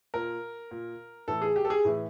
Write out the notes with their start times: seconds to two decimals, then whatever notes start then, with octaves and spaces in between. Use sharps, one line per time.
0.14 A#2 A#4
0.71 A#2
1.28 A2 E3 A4
1.42 G#4
1.56 G4
1.65 A4
1.70 G#4
1.85 A2 E3